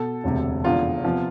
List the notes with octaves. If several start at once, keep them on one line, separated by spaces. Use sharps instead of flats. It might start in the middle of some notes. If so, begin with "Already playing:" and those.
Already playing: B2 A4
E1 D2 C3
F1 E2 D3 F4
C3 F3 B3